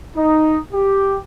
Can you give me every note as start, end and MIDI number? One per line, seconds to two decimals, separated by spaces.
0.16 0.58 63
0.73 1.18 67